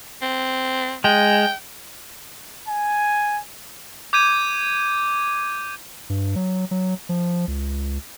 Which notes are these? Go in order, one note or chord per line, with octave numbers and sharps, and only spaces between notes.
C4
G#3 G5
G#5
D6 G6 G#6 D#7
G2
F#3
F#3
F3
C#2